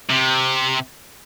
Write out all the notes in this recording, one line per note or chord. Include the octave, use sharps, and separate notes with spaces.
C3